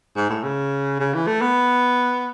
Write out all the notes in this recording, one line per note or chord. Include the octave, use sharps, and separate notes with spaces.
G#2
A2
C#3
C#3
E3
A3
B3